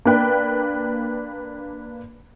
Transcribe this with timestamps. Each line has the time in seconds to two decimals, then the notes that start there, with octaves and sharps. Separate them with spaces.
0.05 A#3 D4 B4 G5